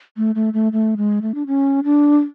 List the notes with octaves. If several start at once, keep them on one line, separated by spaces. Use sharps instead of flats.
A3
A3
A3
A3
G#3
A3
D4
C#4
D4